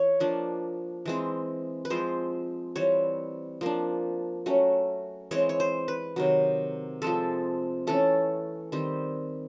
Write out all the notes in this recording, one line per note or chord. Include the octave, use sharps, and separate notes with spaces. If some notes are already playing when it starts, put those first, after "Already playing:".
Already playing: E3 C#5
F3 A#3 D4
E3 G#3 C4
B4
F3 G#3 C4 C5
E3 G3 C4 C#5
F3 A#3 D4
F#3 A3 C#4
E3 G#3 C4 C#5
C#5
C5
B4
C3 D#3 F#3
F3 G#3 C4 A4
E3 A3 C#4 A4
D#3 G3 C4